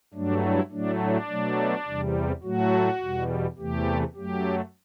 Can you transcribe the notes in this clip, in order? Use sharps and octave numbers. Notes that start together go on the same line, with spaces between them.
G2 F#3 A3 D4
E4
A2 F#3 A3 D4
D4
B2 F#3 A3
E2 C3 G3
A2 F#3 A3 F#4
E2 B2 G3
E2 C3 E3 A3 G4
F#2 F#3 A3 G4